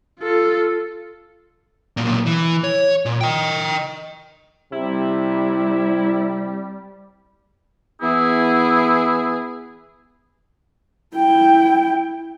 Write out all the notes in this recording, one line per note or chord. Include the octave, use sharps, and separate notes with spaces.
F4 A4
B1 A#2
E3
C#5
A#2
D#5 G5
C3 G3 E4
E3 B3 E4 G#4
E4 G5